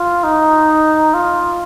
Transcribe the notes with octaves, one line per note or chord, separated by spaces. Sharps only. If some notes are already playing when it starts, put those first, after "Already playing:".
Already playing: F4
D#4
F4